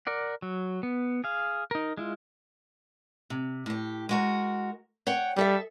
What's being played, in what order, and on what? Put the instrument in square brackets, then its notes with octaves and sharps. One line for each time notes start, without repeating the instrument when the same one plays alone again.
[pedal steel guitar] A#4 D5 F#5
F#3
B3
G#4 F5
D#4 A#4
G#3 E4 F4
[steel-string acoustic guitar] C3
A2 G4
G#3 F#4 A#4
C#5 F#5 G5
[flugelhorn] G3 [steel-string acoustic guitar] G#4 A4 E5